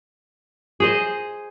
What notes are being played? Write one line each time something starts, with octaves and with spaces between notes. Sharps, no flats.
G#4 C5 D#5